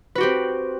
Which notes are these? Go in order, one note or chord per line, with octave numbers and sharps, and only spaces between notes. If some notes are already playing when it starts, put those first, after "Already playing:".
C4 F#4 G4 B4